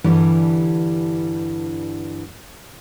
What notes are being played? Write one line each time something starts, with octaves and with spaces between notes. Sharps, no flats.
G2 D3 E3 G3